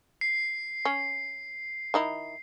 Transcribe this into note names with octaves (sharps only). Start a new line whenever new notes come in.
C7
C#4
D#3 D#4 E4